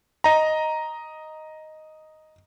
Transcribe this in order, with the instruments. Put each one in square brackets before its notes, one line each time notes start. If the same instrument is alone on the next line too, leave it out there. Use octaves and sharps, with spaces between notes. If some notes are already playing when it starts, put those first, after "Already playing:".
[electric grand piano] D#5 A#5